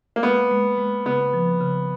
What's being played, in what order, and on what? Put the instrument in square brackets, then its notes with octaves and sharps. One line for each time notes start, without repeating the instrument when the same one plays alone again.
[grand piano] A#3
[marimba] G#3 [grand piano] B3
[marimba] G#3
G#3
[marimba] C#3 [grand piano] B3
[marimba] F3
C#3